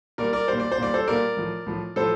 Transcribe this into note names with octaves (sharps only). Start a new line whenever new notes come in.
A#2 G3 A#4 D5
A#4 D5
A#2 G3 C5
D5
C5
A#2 G3 D5
A4 C5
A#2 G3 A#4 D5
A2 F3
A2 F3
A2 F3 A4 C5